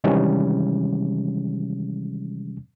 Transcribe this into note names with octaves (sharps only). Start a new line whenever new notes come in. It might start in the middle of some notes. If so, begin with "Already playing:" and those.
C3 D#3 E3 G3 G#3 C#4